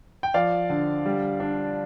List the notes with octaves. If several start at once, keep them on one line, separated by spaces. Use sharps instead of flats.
G5
F3 D5 F5
D3
G3
D4